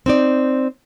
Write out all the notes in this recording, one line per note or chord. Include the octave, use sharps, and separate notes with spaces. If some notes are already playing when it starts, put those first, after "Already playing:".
C4 D#4 D5